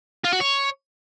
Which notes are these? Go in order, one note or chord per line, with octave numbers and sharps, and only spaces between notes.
F4
F#4
C#5